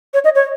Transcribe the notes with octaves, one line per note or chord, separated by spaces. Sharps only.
C#5
D#5
C#5